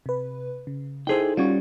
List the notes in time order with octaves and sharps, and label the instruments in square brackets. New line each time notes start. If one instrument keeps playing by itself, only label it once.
[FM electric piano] C3 B4
C#3
[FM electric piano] D#4 A4 C5 [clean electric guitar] E4 G#4 G5
[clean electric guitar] G3 C#4 [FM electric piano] F4 F#4 C#6